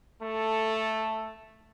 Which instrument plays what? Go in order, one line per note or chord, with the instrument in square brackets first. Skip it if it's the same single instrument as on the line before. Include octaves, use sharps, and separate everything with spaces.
[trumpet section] A3 A4